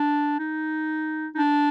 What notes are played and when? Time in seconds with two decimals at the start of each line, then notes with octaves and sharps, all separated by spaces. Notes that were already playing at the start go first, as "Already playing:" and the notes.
Already playing: D4
0.39 D#4
1.35 D#4
1.38 D4